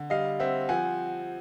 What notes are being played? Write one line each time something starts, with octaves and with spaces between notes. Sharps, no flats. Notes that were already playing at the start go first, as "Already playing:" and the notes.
Already playing: D3
G3 D#5 F5
C4 E5 F#5
F3 F#5 G#5